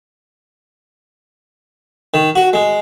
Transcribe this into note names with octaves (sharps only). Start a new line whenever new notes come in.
D#3
F#4
G#3